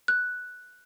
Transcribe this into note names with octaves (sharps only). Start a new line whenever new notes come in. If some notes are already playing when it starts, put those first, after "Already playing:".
F#6